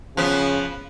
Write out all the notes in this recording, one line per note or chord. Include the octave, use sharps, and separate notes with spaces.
C#3 F3 B3